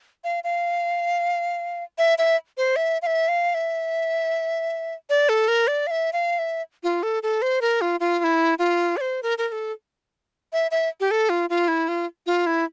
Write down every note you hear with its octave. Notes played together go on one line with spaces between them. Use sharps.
F5
F5
E5
E5
C5
E5
F5
E5
F5
E5
D5
A4
A#4
D5
F5
E5
F5
E5
F4
A4
A4
C5
A#4
F4
F4
F4
E4
F4
D5
C5
A#4
A#4
A#4
A4
E5
E5
G4
A4
F4
F4
E4
F4
F4
E4